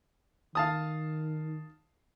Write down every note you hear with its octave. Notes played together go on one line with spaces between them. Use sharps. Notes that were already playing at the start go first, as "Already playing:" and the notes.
D#3 F5 A5 D#6